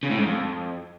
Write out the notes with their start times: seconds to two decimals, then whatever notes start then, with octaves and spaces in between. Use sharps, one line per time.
0.03 C#3
0.11 A2
0.19 G#2
0.27 F2